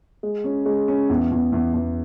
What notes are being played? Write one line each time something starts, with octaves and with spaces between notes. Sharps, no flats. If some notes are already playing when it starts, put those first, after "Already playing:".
G#3
C#4
G#3
C#4
E2
E2
E2
E2